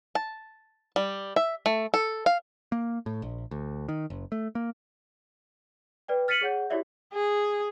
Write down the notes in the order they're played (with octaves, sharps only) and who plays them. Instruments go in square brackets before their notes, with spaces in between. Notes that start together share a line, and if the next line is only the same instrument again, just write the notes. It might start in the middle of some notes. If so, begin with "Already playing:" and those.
[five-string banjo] A5
G3
E5
A3
A4
F5
[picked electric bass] A#3
A2
A#1
D2
D#3
F#1
A3
A#3
[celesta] B4 D5 G5
F6 A6 B6 C#7 D#7 F#7
G#4 C#5 F#5 G6
E4 F#4 G4 C#5 D5 E5
[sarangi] G#4